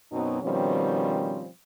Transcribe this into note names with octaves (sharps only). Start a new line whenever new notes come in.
F#2 B2 F#3 B3 C4 D#4
B2 D#3 F3 G3 C4 C#4